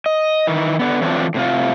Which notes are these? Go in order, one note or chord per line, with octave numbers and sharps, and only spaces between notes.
D#5
D#3 E3
D3 B3
E3 F#3 A3 C4 D4 F4
A2 C3 F4